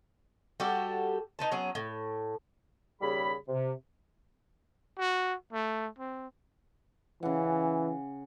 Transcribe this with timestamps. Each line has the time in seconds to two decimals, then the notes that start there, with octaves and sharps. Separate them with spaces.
0.60 G3 F#4 G4 A4
1.39 D#4 B4 A5
1.51 F#3 B3 C#4 G#4
1.75 A2
3.02 D#2 C#3 G3 G#4 B5
3.48 C3
4.99 F#4
5.53 A3
5.99 C4
7.23 C#3 E3 F#5